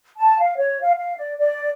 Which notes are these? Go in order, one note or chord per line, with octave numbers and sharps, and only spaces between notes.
A5
F5
C#5
F5
F5
D5
D5